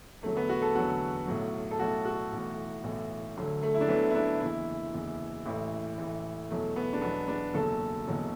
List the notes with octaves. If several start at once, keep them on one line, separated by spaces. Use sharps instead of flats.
E2 D3 F#3 A3
B3
F#4
A4
E2 D3 F#3 F#4
B1 A2 F#3
A4
B1 A2 F#3 F#4
F#4
B1 A2 E3
B1 A2 E3
D2 D3 F#3
A3
E4
D4
D2 D3 F#3 B3
E4
D4
F#1 E2 E3 E4
F#1 E2 E3
A1 A2 E3
A1 A2 E3
E2 B2 F#3 A3
B3
D4
E2 B2 F#3 B3
D4
F#1 E2 B2 F#3 A4
F#1 E2 B2 F#3